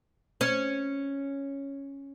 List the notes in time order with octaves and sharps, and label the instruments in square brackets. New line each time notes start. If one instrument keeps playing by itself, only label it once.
[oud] C#4